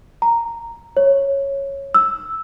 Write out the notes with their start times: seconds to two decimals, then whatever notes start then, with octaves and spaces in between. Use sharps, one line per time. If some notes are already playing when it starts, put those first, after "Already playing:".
0.22 A#5
0.97 C#5
1.94 E6